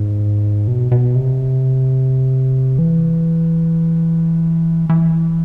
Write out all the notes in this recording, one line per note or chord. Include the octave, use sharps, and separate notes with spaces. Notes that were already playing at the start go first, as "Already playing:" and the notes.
Already playing: G#2
B2
B2
C3
E3
E3